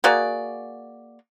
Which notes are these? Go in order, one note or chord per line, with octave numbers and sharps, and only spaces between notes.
A#3 F#4 G#4 D5